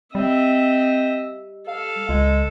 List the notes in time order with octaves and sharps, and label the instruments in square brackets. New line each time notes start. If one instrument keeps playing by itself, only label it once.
[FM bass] G3 [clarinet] C4 [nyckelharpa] D#5 E5
[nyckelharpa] A4 [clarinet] F5
[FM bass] C#2 [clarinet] G#3